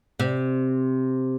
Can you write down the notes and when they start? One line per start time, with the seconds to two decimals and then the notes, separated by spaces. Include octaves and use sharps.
0.20 C3